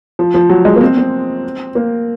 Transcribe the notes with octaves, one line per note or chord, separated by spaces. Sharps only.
F3
F3
F#3
G#3
A#3
C4
C4
A#3